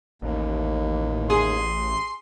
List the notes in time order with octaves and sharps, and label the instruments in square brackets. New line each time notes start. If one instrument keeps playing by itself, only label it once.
[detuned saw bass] A1 [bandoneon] D#2
[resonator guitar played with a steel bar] G#4 [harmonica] C6